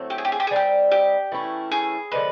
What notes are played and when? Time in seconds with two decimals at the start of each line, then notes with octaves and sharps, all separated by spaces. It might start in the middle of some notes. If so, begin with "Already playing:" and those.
Already playing: A2 F#3 A3 C4
0.10 G4
0.18 G#4
0.25 G4
0.32 G#4
0.40 G4
0.47 G#4
0.51 G3 C4 D#4 G4
0.92 G4
1.32 E3 A3 C#4 E4
1.72 G#4
2.12 D3 F3 G#3 C4 B4